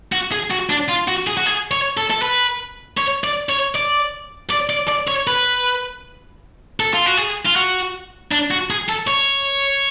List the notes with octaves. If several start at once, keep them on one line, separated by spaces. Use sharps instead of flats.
F#4
G#4
F#4
D4
F4
F#4
G#4
F#4
G#4
C#5
A4
A4
B4
C#5
D5
C#5
D5
D5
D5
D5
C#5
B4
A4
F4
F#4
G#4
F4
F#4
D4
F#4
G#4
A4
C#5